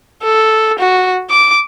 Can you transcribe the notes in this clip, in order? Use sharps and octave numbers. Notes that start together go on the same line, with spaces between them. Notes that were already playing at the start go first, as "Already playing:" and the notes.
A4
F#4
D6